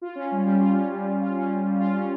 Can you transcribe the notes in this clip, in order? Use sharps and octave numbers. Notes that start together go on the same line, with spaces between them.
F4
C#4
G3
G3
F4
C#4
G3
G3
F4
C#4
G3
G3
F4
C#4